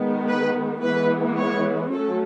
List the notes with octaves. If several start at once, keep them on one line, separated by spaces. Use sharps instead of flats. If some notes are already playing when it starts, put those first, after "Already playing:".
Already playing: D#3 G#3 B3
B4
E3 G#3 B3 B4
C#5
F#3 A3 C#4 A4